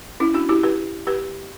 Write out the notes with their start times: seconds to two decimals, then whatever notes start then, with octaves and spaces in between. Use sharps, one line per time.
0.20 C#4 E4
0.34 D4 F#4
0.49 E4 G4
0.63 G4 B4
1.07 G4 B4